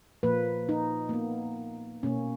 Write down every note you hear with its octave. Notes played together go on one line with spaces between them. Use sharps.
A#2 F3 A#3 B4
D#4
A#3
B3
B2 A#3 C#4